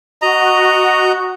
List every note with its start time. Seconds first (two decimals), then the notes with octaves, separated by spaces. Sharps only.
0.22 F#4 D#5 A#5